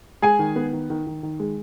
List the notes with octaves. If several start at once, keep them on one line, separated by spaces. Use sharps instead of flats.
G#3 G#4 G#5
D#3
B3
D#3
D#3
D#3
D#3
G#3